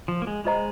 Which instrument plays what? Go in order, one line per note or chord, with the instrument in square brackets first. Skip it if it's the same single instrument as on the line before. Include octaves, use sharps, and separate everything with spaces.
[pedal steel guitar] F3
A#3
G#3
[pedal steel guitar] G#3 [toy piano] F4 C5 D#5 A#5